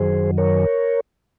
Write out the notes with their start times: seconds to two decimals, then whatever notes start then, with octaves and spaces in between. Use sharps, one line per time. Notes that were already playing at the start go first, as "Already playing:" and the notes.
Already playing: F#2 D#3 F#3 G#4 C5
0.38 A#4 C#5